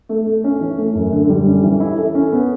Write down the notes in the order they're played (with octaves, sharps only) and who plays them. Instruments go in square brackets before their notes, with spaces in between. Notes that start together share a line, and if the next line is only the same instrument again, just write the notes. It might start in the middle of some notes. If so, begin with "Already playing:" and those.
[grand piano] A3
A3
C#4
E3
A3
F#2
D3
G3
C#4
E3
E4
A4
C#4
B3